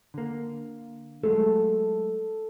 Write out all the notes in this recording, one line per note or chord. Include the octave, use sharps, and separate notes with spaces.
D3 A#3
F#3 G#3 A3 A4